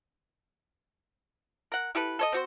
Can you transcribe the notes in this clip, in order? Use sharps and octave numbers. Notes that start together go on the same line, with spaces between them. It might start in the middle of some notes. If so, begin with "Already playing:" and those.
A#4 F#5
E4 G4 A4 B4
A4 C#5 D#5
C4 F#4 C5